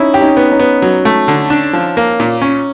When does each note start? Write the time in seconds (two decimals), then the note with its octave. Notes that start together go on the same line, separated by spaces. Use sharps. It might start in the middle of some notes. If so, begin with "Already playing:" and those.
Already playing: C#4 D#4 E4
0.14 G4
0.21 C#4 D#4
0.37 B3
0.51 C#4 D#4
0.60 B3
0.82 F#3
1.05 A3
1.28 D3
1.50 D4
1.73 F3
1.97 A#3
2.20 A#2
2.42 C#4